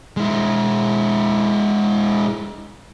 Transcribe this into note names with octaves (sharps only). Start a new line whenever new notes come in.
G#3 E4